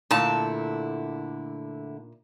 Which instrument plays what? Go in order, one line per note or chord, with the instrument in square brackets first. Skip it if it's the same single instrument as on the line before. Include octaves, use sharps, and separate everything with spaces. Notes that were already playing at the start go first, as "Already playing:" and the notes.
[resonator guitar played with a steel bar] A#2 A5 [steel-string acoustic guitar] D3 A3 E4